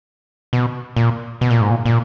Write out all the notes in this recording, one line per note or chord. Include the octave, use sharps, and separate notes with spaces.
B2
A#2
B2
A#2
G#2
A#2
A#2